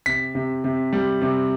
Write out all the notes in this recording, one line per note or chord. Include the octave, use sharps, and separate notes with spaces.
C3 B6
C3
C3
G3
C3